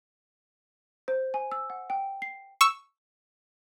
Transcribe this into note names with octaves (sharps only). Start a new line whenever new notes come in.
C5
G#5
E6
F#5
G5
C7
C#6 E6 E7